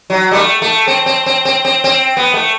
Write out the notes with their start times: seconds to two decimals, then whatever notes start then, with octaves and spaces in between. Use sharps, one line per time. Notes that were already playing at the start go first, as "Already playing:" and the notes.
0.10 F#3
0.31 G3
0.36 A3
0.62 A3
0.88 C4
1.06 C4
1.26 C4
1.45 C4
1.65 C4
1.84 C4
2.17 B3
2.34 A3